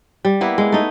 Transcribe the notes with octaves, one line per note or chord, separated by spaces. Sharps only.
G3
A#3 B3 E4
G#3
A3 D#4